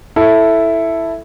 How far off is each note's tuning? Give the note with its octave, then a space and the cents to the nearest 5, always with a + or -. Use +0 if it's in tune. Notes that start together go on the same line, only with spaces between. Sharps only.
E4 +0 A4 +0